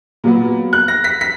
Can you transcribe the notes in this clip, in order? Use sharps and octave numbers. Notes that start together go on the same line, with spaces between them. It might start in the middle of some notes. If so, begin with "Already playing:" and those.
A#2 F#3 B3
F#6
A#6
B6
B6